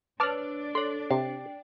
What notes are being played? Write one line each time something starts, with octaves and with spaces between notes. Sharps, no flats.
D4 B4 C#5 D5 A5 D6 F6
A4 C#5 C6
C3 G5